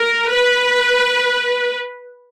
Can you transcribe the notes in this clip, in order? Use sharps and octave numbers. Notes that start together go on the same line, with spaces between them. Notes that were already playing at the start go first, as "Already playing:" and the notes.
Already playing: A#4
B4